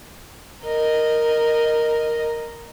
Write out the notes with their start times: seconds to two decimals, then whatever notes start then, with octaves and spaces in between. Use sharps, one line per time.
0.63 A#4 D#5